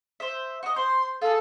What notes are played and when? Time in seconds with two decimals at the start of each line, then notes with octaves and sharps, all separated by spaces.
0.20 C5 E5
0.63 F#4 D#5
0.76 C5 C6
1.21 F4 G#4 A4